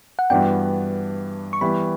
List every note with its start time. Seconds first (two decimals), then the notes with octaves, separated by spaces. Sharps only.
0.19 F#5
0.30 G2 E3 B3 D4 F#4 G5
1.53 C#6
1.61 E3 G3 B3 B5